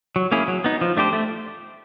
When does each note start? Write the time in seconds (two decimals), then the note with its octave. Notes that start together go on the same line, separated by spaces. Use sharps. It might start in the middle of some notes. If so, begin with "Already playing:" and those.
0.16 F#3
0.32 A#3 C#4 E4 G#4
0.48 F#3
0.64 B3 D#4
0.81 F3
0.97 A3 D4 G4 C5
1.13 A3